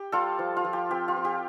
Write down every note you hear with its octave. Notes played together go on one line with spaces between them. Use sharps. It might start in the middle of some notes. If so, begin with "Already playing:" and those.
Already playing: G4
G3 F4 A4
F3
F4
F3
G4
C4 G4
F4
C4
G4